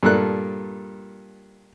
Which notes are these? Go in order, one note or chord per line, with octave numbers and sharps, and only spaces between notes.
G2 A#2 A4 A#4 F#6